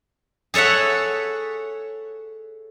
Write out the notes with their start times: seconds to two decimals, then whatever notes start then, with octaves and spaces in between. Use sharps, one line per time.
0.54 G#4 A4 C#5 E5 F#5